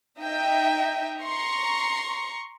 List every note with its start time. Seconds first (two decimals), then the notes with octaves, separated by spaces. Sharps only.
0.20 D#4 D#5 E5 G5
1.22 A#5 C6 C#6